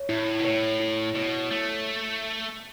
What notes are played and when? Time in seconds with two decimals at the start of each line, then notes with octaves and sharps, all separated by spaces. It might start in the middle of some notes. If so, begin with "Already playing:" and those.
Already playing: C#5
0.09 A2 E4
0.39 B2
0.45 A2 C#5
0.80 E4
1.16 B2 C#5
1.51 A3 C#5